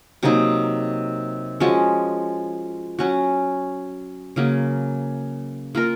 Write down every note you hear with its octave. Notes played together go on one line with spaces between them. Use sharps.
C3 F#3 A#3 D#4
F3 G#3 C#4 F#4
F#3 C#4 F#4
C#3 F#3 A#3
A#3 F4 A#4